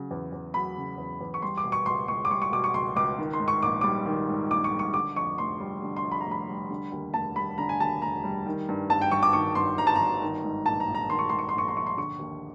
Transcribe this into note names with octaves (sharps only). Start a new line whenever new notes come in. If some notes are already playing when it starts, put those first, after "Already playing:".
Already playing: C#3 F#3
E2
E2
F#3 B5
C#3
E2
E2
C#6
G3 C6
D6
B2
C#6
C#2 C6
C#2 C#6
D6
G3 C#6
C#6
B2 D6
C#6
C#2 C6
C#2 D6
D#3
C6
G#2
C#6
A#1 D6
G3 D6
D#3
G#2
A#1 D6
C#6
G3
C#6
D3 D6
F2 C#6
F1 C6
G3
D3
C6
F2
B5
A#5
F1
B5
G3
D3
D#2
F1 A5
G3 B5
D3 A#5
G#5
D#2 A5
F1 A#5
G3
D#3
G2
G1 A5
G5
G1 C#6
D6
D#3 C#6
G2 C6
G1 A#5
A5
G1 A#5
D#3
G#2
A#1 A5
A#5
A#1
A#5
D#3 C6
C#6
G#2 C6
C#6
C6
A#1 C#6
C6
A#1 C#6
C6
D3 C#6
D#2